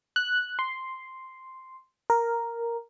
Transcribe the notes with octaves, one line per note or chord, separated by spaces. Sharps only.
F#6
C6
A#4